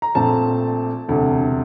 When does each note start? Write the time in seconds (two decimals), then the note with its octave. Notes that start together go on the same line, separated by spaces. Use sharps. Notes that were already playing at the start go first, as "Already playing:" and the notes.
0.02 A#5
0.15 A#1 A#2 A3 C4 A5
1.08 E1 D2 C3